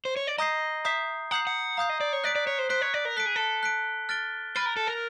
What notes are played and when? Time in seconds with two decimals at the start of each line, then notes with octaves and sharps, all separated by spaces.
0.05 C5
0.16 C#5
0.27 D5
0.38 D#5 A#5 D#6 G6 C7
0.85 E5 A#5 D#6 G6 C7
1.31 F#5 A#5 D#6 G6 C7
1.47 F#5
1.77 F5 A#5 D#6 G6 C7
1.89 D#5
2.01 D5
2.13 C#5
2.24 D5 F#6 B6 D7
2.35 D5
2.47 C#5
2.59 C5
2.70 C5 F#6 B6 D7
2.82 C#5
2.94 D5
3.05 A#4
3.17 A4 F#6 B6 D7
3.26 G#4
3.36 A4
3.63 F#6 B6 D7
4.09 F6 A6 D7 G7
4.55 B4 F6 A6 D7 G7
4.66 A#4
4.77 A4
4.87 A#4